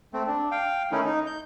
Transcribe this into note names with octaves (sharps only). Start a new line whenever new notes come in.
A3 C4
D4
F5 G5
D#3 A3 C#4 D#4 E4
D#4
G6